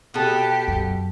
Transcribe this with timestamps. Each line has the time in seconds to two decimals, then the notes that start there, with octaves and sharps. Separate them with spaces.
0.14 B2 G4 A4
0.68 F#2